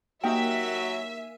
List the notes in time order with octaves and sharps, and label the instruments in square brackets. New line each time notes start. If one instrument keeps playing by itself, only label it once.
[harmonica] F#3 [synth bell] A#3 A#4 G#5 [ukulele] D#4 G4 G5 [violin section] E5